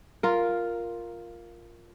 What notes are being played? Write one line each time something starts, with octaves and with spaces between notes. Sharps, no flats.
F4 A#4